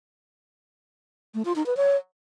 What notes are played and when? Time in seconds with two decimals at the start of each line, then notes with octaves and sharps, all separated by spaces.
1.35 A3
1.45 F4
1.56 D#4
1.66 B4
1.77 C#5